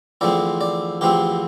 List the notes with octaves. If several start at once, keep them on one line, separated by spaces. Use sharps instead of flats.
E2 D3 F3 A3 C4 D5
D5
E2 D3 F3 A3 C4 G4